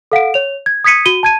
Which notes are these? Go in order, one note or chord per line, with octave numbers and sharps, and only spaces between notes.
A4 F5 F#5 D7
C#5 F7
G#6
D#6 G#6 B6 C#7 D#7
F#4 D#7 G7
A5 G#6 D#7